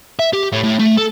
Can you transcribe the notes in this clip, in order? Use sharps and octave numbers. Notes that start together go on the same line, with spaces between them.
E5
G4
A2
A2
A3
A4